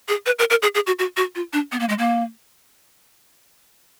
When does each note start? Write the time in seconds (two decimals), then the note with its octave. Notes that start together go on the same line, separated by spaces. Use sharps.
0.08 G#4
0.26 B4
0.39 A#4
0.50 A#4
0.62 G#4
0.75 G#4
0.87 F#4
0.99 F#4
1.17 F#4
1.35 F4
1.53 D4
1.72 B3
1.80 A#3
1.89 G#3
1.99 A#3